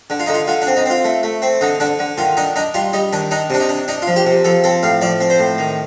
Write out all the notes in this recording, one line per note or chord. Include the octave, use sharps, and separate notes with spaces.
D3
F4
D3 D#4
F4
D3 F4
D4
C4
D#4
C4 F4
A3
A3
C4
D3 D#4
D3 D4
D3
D#3 F4
D4 D#4
D4 D#4
G3 F4
G3 D#4
D#3 D4
D4 D#4
C3 D4
D#4
D4
D4 D#4
F4
F3
G4
C3
F3 A4
C4 A4
A2 F5
F3 D5
C4
C5
A2
D#3